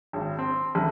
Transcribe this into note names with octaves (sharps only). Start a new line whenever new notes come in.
G#1
C4
A1